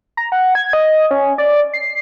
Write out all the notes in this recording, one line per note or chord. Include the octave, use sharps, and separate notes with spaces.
A#5
F#5
G#6
D#5
C#4
D5
C7